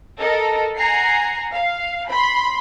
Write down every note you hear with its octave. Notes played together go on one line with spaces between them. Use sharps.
A4 A#4 D#5
F#5 G#5 A#5 C7
F5
B5 C6